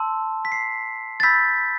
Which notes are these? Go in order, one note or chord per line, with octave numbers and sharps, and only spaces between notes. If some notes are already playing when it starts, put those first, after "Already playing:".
Already playing: A5 C6 E6
B6
A5 C6 E6 C7
A6
B5 E6 G6 B6